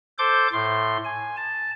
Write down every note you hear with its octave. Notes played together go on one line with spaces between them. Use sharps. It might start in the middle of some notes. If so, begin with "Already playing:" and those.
A4 C5 D6 G6
A2 C6
G#5
A5